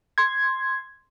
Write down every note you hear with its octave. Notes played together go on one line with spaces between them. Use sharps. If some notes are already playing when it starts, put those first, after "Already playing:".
C6 G#6